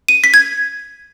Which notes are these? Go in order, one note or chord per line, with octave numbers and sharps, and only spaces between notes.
D#7
B6
G#6